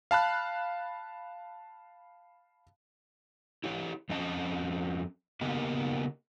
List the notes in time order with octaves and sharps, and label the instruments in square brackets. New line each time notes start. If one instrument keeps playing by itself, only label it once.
[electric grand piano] F5 A5 B5 F#6
[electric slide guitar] E4 G4 C#5
F2 C4 C#4 D#5 A5
C#3 A#3 B3 G4 A#4 D#5